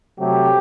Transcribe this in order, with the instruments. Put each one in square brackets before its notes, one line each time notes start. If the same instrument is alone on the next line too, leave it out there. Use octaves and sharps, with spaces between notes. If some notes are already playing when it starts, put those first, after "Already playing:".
[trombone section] C3 F#3 A3 G4